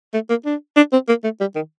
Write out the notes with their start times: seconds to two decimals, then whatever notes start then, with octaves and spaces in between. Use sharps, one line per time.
0.14 A3
0.30 A#3
0.46 D4
0.77 D4
0.92 C4
1.08 A#3
1.24 A3
1.40 G3
1.56 D#3